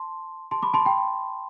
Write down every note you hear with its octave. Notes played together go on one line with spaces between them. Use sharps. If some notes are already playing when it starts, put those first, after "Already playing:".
Already playing: A5 C6
A5 C6
B5 D6
A5 C6
G5 B5